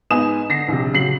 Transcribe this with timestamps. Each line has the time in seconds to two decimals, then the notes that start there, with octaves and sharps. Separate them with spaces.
0.11 G#2 B3 D#4 G#5 D#6 E7
0.49 D3 A#6 C7
0.68 A#1 C3
0.93 C#3 F#3 C7 F#7